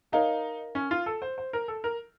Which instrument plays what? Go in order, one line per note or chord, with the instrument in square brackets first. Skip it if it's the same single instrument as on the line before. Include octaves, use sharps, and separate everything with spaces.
[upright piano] D#4 [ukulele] A#4 C#5 F5 A#5
[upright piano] C#4
F4
A4
C5
C5
A#4
A4
A#4